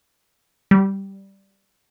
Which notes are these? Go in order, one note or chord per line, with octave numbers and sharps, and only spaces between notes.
G3